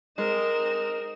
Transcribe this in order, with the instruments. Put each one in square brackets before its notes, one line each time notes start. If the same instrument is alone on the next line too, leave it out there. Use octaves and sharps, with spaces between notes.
[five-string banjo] G#3 [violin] C4 E7 [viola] D#4 [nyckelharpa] A#4